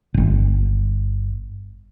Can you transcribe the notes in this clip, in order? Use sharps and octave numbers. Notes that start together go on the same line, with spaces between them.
D1 G1